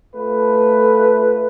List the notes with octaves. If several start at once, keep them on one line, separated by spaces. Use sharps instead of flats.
A3 F4 B4